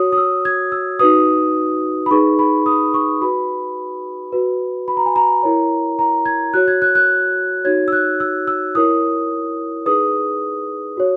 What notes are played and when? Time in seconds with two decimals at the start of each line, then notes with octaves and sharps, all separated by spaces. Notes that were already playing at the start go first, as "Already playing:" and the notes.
Already playing: F#4 C#5 D#6
0.12 D#6
0.17 E6
0.45 G#6
0.72 E6
0.99 D#4 F#4 B4 D#6
2.06 B5
2.11 D#4 G#4 B4 C#6
2.39 B5
2.66 D#6
2.94 C#6
3.21 F#4 B4 B5
4.32 F#4 B4
4.88 B5
4.97 A#5
5.06 G#5
5.16 A#5
5.43 E4 A#4 C#5
5.99 A#5
6.26 G#6
6.54 F#4 C#5 F#6
6.68 G#6
6.82 F#6
6.95 F#6
7.65 D#4 F#4 C#5 G#6
7.88 E6
7.92 F#6
8.20 E6
8.47 E6
8.75 E4 A#4 C#5 D#6
9.86 D#4 G#4 B4 D#6
10.97 F#4 C#5